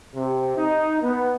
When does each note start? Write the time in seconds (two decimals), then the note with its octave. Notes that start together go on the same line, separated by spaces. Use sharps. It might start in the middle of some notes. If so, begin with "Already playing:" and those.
0.15 C3
0.57 D#4
1.00 B3